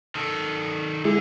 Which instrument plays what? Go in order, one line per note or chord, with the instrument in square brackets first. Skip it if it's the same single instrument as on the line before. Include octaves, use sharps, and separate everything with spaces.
[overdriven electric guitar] D#3 A4
[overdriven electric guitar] D3 [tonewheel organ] G#3 E4 G#4